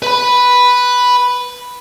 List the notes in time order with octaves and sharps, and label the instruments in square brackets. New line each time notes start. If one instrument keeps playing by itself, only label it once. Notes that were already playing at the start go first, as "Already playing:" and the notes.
[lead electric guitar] B4 B5